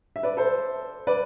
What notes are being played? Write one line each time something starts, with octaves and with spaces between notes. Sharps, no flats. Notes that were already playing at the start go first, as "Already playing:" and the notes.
E5
B4 D5
A4 C5
B4 D5